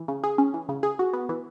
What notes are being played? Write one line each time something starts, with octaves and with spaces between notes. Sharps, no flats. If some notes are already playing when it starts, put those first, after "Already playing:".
Already playing: E3
C#3
G#4
C#4
E3
C#3
G#4
F#4
B3
E3